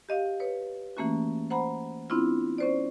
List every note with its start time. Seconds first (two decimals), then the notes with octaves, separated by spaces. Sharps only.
0.09 G4 D#5 F5
0.40 B4 C#5
0.97 E3 A3 A#3 C#4 F#4
1.50 C5 F#5 A#5 B5
2.10 B3 C4 D4 E4 F4
2.58 C#4 C5 D5